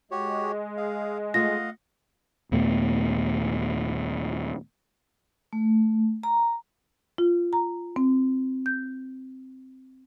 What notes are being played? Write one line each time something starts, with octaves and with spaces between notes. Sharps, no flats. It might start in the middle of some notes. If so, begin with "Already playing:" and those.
G#3 F#4 G4 C#5
G#4 F5
A3 F4 D#5 F5 F#5 A#6
D#2 A#2 A3 B3
A3
A#5
F4
A#5
C4
G6